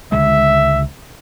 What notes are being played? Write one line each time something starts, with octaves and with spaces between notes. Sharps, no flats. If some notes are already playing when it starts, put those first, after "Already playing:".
C#2 D3 G#3 E5